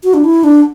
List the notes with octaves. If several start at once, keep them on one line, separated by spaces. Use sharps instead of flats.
F#4
D4
E4
D4